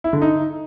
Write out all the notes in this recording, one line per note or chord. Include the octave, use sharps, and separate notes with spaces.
E4
D3
D#4